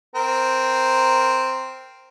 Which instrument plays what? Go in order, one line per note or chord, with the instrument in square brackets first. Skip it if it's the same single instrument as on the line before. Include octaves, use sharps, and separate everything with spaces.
[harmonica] C4 A#4